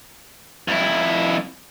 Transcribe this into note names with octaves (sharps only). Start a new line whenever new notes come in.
F2 E4